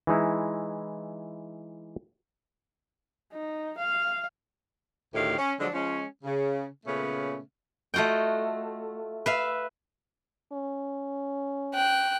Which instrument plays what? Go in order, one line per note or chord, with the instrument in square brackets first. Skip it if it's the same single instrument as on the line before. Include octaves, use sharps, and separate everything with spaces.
[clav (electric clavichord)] E3 G#3 D#4 E4
[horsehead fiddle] D#4
F5
[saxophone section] D2 A2 D#3 G4 F5
C#4
D3 F3 F#3 G#3 D4
F3 G#3 C#4
C#3
A#2 C#3 A3 B3 C#4
[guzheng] A3 F4 F#4 D#5 G5
B4 E5 F5
[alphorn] C#4
[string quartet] G5 F#6